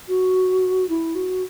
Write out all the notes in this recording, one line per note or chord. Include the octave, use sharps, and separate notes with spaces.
F#4
E4
F#4